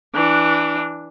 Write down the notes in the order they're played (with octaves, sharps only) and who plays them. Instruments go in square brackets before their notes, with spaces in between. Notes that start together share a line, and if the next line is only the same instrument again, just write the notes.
[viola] E3 D4